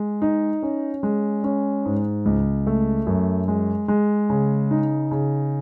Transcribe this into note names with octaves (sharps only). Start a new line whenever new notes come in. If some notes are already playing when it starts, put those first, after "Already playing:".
Already playing: G#3
D#4
C#4
G#3
C#4
G#2
C#2
A3
F#2
G#3
G#3
C#3
D#4
C#3